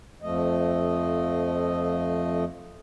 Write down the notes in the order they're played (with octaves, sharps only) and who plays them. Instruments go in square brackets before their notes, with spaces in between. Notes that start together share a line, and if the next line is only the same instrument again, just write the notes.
[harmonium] F2 F3 A3 D#5